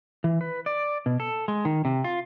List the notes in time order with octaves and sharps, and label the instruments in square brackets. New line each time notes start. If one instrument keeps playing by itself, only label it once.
[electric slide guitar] E3
B4
D5
B2
A4
G#3
D#3
C3
F4